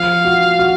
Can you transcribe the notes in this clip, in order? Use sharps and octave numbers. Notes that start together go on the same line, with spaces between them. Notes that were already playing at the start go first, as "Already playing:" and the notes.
Already playing: F3 F5
F#4
F#4